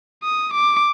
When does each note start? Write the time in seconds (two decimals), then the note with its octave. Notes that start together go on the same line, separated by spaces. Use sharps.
0.24 D#6
0.54 D6